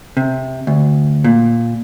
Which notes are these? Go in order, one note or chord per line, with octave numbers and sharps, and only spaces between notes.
C3
D2
A#2